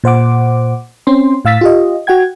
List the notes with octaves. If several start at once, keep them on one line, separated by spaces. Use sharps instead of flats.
A#2 C5 F#5 D6
C4 C#4 C6
A2 F5 E6 A6 B6
F4 G4 D#5
F#4 F#5 G5 G#6